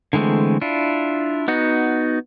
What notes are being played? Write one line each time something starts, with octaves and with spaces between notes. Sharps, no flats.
D3 E3 G#3 A3 C4
D4 E4 F4
B3 D#4 F#4